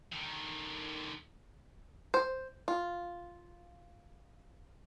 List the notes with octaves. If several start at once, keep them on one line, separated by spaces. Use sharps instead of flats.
D3 D#3
C5
F4